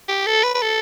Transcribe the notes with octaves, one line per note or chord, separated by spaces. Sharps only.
G4
A4
B4
B4
A4